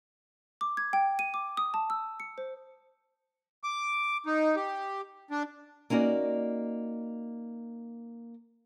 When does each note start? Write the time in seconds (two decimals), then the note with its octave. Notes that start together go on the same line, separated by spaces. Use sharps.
0.61 D6
0.77 G#6
0.93 G5
1.19 D#7
1.34 D6
1.57 D#6
1.74 A5
1.90 E6
2.20 C#7
2.38 C5
3.64 D6
4.26 D#4
4.56 G4
5.31 D4
5.90 A#3 C#4 D#4 F#4 D5